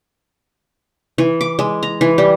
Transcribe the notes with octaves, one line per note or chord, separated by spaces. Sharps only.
E3
D6
G#3
A#5
E3
G3